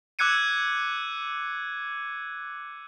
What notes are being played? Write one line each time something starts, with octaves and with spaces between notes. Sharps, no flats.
D6 E6 F#6 G#6 C#7 D#7